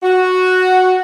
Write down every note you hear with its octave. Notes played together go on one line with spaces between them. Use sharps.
F#4